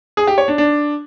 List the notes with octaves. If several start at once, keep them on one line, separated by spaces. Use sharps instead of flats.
G#4
G4
C#5
D4
D4